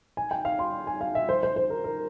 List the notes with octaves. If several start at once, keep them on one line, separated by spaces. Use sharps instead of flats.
G#5
G5
F5
C6
G#5
F5
E5
C5
C5
C5
A#4
A#4